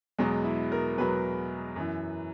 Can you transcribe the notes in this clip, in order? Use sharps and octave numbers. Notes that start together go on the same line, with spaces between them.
E2 B2 F#3 G#3
E4
A#4
E2 B2 F#3 B4
F#2 E3